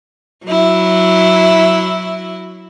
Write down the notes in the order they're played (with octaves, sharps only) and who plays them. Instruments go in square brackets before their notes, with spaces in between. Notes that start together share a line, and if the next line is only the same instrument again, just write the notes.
[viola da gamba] F#3 E4